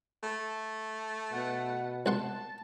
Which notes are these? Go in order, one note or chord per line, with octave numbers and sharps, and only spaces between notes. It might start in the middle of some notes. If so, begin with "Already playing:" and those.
A3
B2 B4 F#5
C2 F#5 A5 C6